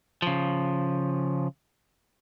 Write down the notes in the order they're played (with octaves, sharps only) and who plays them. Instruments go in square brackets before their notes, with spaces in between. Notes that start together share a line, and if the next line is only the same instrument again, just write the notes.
[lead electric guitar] C#3 F3